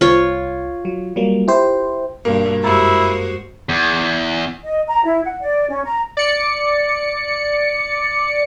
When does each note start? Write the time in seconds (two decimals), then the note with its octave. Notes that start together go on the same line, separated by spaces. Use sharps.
0.01 C2 F4 C#5
0.85 F#3
1.16 F#3 G3 A#3
1.48 E4 G4 C5
2.25 G2 B2 A#3
2.64 F#2 G#3 E4 F#4 G4 C5 E6
3.69 E2
4.63 D#5
4.88 A#5
5.04 E4
5.25 F#5
5.41 D5
5.69 C#4
5.85 A#5
6.17 D5 C#7